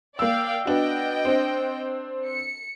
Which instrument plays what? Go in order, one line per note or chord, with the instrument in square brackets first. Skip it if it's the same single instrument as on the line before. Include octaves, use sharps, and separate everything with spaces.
[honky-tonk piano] A#3 E6 [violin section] D5 F5 G5
[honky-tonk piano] B3 D4 F#4 [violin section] D#5 G5
[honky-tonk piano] C4 D4
[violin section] C#7